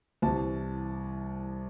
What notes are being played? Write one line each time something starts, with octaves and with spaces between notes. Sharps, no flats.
C2 C3 E3 A5